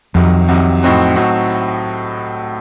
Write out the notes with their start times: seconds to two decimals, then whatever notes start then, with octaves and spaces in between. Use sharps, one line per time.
0.14 C2 F2 C3 D#3 F#3
0.48 C2 C3 D#3 F#3
0.83 A2 F#3 C4 D#4 F#4
1.16 A2 F#3 C4 D#4 F#4